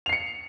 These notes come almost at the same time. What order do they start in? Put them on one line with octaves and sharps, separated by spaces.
F7 C7 C#7